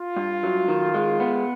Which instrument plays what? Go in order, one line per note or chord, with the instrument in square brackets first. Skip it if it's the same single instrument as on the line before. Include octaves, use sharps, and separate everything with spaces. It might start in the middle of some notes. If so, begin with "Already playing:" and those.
Already playing: [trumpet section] F4
[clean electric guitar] G2
F#3
D#3
G#3
B3